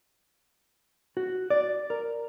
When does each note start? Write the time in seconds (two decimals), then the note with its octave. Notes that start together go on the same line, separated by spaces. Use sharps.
1.17 F#4
1.50 D5
1.90 A#4